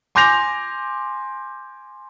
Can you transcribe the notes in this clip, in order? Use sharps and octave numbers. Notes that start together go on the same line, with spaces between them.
G#5 C6 D6 G6 A#6 F7